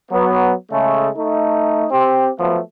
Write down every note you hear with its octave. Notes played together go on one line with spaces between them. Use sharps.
F#3 B3
C#3 G#3 A3
A3 D#4
C4 G4
F3 F#3 A3 B3